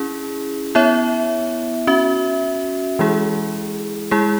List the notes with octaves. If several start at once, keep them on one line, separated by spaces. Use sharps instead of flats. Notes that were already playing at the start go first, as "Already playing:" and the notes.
Already playing: C#4 E4 G#4
B3 E4 C#5 E5
C#4 F#4 E5
E3 G#3 E4 G#4
G#3 E4 G#4